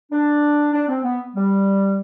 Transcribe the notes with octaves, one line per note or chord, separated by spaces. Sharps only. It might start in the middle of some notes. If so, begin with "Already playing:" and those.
D4
D4
C4
B3
G3